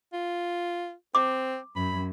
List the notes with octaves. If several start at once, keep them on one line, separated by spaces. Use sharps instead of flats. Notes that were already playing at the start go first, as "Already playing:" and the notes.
F4
C4 D6
F#2 B5